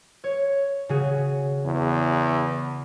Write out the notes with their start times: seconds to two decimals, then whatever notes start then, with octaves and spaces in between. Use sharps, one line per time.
0.24 C#5
0.89 C#3 F#4 G#4
1.65 E2